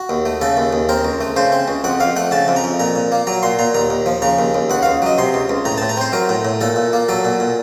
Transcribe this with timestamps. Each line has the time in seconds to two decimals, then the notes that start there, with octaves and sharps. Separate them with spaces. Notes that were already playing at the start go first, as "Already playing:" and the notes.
Already playing: F#4
0.09 D#2
0.25 A3
0.41 C#3 A4
0.57 D#2
0.73 D#2
0.89 C4 A#4
1.05 C#2
1.21 A3
1.36 C#3 C5
1.52 C4
1.68 C#2
1.84 F2 F#5
2.00 F2 F5
2.16 A3 F#5
2.31 C#3 A5
2.48 F2
2.56 A#5
2.64 F2
2.80 A#2 A#5
2.95 A#2
3.12 A#3
3.27 F#3 A#5
3.43 A#2 C6
3.59 A#2 A#5
3.74 D#2 A#5
3.90 D#2
4.06 F3
4.22 C#3 A#5
4.38 D#2
4.54 D#2
4.70 C#2 F#5
4.82 C#2 F5
5.02 F#3 D#5
5.18 C3 C6
5.34 C#2
5.49 C#2
5.65 A2 A#5
5.78 A2 A5
5.89 A#5
5.97 C4 C5
6.13 F#3 A#4
6.29 A2
6.45 A2
6.61 A#2 A4
6.76 A#2
6.93 A#3
7.09 F#3 A4
7.25 A#2
7.40 A#2